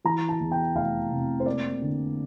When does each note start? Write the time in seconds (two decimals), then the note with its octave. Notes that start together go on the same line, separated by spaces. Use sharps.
0.05 E3 A#5
0.29 A5
0.40 E2
0.52 G5
0.75 F1 F5
1.12 C3
1.40 C5
1.46 A#3 D5
1.81 D3